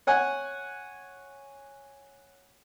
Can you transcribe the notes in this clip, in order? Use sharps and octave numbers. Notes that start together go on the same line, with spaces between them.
C#5 F#5 G#5